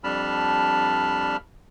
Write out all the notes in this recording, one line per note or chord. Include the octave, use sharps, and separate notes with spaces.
F2 G3 D4 A5 B5 F6